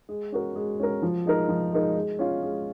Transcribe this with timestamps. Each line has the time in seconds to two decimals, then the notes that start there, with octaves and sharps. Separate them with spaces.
0.09 G#3
0.32 C#4 F#4 A#4
0.56 G#3
0.79 C#4 F#4 A#4
1.02 F3
1.25 G#3 D#4 A#4
1.49 F3
1.72 G#3 D#4 A#4
1.96 G#3
2.19 C#4 F4
2.42 G#3